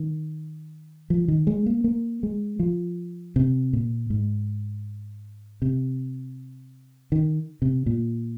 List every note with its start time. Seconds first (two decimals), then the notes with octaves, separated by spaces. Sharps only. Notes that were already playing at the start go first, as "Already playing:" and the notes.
Already playing: D#3
1.10 F3
1.28 D#3
1.47 G#3
1.66 A#3
1.84 A#3
2.23 G#3
2.60 F3
3.36 C3
3.73 A#2
4.10 G#2
5.62 C3
7.12 D#3
7.62 C3
7.86 A#2